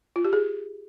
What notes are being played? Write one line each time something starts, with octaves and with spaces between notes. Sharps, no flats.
F4
G4
G#4